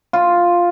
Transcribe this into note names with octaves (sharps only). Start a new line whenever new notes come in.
F4